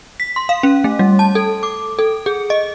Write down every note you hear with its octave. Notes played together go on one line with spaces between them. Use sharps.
B6
C6
F5
C#4
A3
G3
A5
A4
D6
A4
G#4
D#5